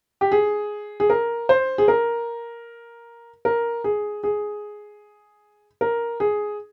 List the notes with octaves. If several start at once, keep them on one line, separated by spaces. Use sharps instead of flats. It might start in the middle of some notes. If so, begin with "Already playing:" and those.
G4
G#4
G#4
A#4
C5
G#4
A#4
A#4
G#4
G#4
A#4
G#4